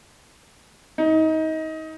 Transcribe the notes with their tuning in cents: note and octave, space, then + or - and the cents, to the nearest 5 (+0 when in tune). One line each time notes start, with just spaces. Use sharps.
D#4 +25